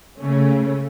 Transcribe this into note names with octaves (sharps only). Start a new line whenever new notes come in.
C#3 A3 C#4